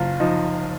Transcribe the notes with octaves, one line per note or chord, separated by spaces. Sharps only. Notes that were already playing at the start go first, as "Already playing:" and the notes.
Already playing: F#1 F4
F3 D#4